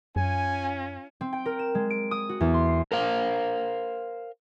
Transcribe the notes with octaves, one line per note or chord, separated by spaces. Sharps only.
F#2 C#4 F4 G#5
C4
G5
A#4
E7
G#3
D7
D#6
F#4
E2
C6
C7
A#4 C5 F5